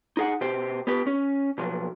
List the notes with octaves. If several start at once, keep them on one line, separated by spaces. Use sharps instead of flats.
D#4 G#4 F#5
B2 G4 C5
B3 G4 B4
C#4
B2 F3 F#3